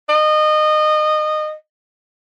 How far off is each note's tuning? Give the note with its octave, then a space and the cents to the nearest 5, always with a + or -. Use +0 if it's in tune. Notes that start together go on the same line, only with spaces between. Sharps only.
D#5 -25